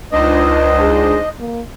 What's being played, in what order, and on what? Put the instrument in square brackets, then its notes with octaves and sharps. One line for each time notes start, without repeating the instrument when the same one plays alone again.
[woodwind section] C#2 [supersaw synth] D4 D#4 C5 [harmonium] D#5
[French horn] G#4
A#3